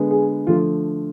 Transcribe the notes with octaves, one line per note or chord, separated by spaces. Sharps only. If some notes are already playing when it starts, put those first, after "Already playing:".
Already playing: D3 G#3 B3
G#4
D3 F3 A3 F4